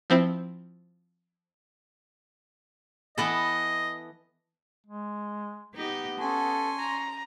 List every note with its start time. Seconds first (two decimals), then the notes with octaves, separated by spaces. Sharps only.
0.10 F3 C4 E4
3.18 E3 B3 A4 D#5
4.86 G#3
5.75 B3 D#4 G4 D#5
6.20 C#4 A4 G#5 C6 C#6
6.80 A#5